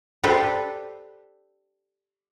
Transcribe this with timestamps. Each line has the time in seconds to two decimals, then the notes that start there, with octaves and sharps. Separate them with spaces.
0.24 D4 G4 A4 B4 C5